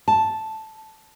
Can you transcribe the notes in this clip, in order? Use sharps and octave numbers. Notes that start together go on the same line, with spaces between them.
A5